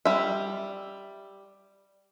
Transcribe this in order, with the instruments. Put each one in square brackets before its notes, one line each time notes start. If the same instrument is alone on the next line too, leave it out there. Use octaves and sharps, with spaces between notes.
[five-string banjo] G3 E5